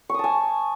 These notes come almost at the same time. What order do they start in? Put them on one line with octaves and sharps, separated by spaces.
C#6 D#6 A5 G#5